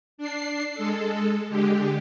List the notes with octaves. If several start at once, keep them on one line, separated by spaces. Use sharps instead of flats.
D4 C7
G#3 A4
D3 G#3 G4